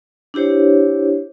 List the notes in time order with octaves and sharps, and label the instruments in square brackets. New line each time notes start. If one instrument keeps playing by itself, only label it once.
[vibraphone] D4 E4 G4 C5 C#5